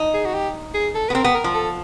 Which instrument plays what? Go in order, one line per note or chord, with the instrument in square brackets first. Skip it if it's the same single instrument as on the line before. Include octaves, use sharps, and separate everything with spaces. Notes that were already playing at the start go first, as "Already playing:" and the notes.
Already playing: [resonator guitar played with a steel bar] D#4
[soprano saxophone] G#4
F#4
G4
G#4
A4
[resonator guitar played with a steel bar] B3 [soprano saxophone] B4
[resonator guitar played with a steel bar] C4 [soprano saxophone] A#4
[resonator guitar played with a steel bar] B3
[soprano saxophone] A#4
[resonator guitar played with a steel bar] F3
[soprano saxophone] A4